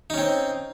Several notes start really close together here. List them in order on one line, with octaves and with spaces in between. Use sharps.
D#4 C#4 C4